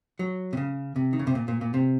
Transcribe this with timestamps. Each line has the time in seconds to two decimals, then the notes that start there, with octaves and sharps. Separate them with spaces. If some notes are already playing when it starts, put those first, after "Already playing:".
0.19 F#3
0.53 C3
0.57 C#3
0.96 C3
1.13 D#3
1.19 C#3
1.27 C3
1.35 A#2
1.48 A#2
1.61 A#2
1.74 C3